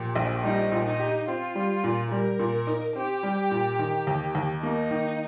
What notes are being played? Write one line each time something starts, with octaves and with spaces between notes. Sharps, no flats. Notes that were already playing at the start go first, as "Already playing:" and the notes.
Already playing: A#2 F3 G4
A#1
G3 D#4
A#2
D#4
G4
C4 F4
G3
A#2
G3 A#4
A#2
D#4
C4 G4
G3
A#2
D#3
D#2
D#2
A#3 D#4
D#3